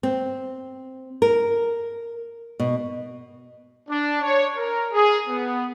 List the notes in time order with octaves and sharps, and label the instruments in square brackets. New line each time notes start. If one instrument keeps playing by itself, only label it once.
[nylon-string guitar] C4
A#4
B2
[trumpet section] D4
C#5
A#4
G#4
B3